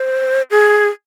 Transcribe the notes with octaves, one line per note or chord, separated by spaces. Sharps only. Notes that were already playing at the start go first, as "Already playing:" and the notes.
Already playing: C5
G#4